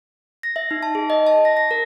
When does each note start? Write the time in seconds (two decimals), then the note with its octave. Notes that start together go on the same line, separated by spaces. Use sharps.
0.43 A#6
0.56 E5
0.71 D#4
0.83 A5
0.95 G#4
1.10 D#5
1.27 A5
1.45 A#6
1.57 A#6
1.71 A#4